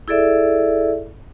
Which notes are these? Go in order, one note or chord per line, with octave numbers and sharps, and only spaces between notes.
E4 G#4 A4 D5 E5